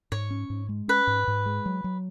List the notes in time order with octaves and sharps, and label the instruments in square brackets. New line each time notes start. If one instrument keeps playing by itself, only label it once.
[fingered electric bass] G#2 [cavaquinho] C#5
[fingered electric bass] C#4
G#2
G#3
[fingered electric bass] C#4 [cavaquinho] B4
[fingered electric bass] G#2
G#2
G#3
F#3
F#3